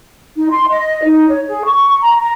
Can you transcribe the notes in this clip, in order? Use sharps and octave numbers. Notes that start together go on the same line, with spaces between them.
D#4
C6
D#5
D#4
C#5
G#4
C#6
A#5
A#5